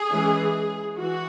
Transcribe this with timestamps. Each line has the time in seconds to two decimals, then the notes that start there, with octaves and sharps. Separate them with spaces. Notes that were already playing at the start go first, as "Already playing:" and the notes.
Already playing: G#4
0.10 E3 G#3 C#4
0.98 E3 F#4